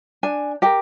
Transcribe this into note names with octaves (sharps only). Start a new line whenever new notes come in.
D4 G#5
G4 A#4 G5